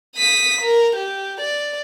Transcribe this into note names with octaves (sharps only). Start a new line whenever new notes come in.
D#6 B6
A#4
G4
D5